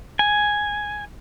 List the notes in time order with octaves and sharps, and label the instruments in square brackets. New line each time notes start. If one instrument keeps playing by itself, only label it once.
[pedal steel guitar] G#5